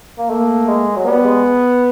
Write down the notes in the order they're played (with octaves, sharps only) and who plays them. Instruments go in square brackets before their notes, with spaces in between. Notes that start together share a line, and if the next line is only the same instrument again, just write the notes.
[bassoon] A#3
[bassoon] A3 [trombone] A#3
[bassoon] G#3
F#3
[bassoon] G3 [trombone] B3
[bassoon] G#3